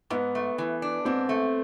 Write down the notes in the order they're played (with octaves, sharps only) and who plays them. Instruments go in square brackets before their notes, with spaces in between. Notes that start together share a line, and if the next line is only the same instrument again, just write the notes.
[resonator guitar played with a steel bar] G#2 [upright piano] B3
[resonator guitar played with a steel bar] A3
E3
D4
[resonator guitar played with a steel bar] G#2 [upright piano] C4
[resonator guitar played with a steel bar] A3